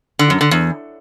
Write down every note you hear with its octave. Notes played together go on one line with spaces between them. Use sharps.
D3
F#2
D3
E2